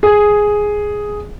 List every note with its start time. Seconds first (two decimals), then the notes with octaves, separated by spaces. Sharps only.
0.03 G#4